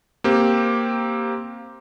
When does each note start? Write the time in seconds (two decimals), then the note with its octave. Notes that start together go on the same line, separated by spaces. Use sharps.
0.24 A#3 C4 G4